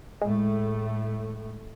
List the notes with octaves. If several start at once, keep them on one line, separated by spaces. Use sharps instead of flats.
A2 G#3 A3